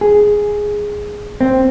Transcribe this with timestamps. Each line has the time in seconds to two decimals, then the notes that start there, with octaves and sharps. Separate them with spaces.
0.01 G#4
1.41 C4